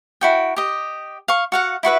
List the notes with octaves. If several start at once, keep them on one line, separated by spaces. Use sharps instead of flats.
E4 F#4 G5
G4 D#5
F5 C#6
F#4 F5 F#5
E4 F#4 B4 E5